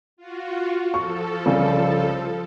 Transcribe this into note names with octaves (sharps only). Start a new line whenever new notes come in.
F4 F#4
F3 A4 C#6
C2 C#3